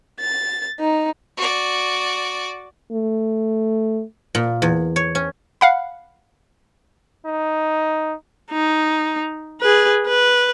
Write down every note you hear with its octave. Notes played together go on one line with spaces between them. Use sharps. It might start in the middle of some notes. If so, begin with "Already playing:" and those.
A6
D#4
F#4 D5
A3
A#2
E2
C#5
C#4
F5 F#5 B5
D#4
D#4
G#4 B4
B4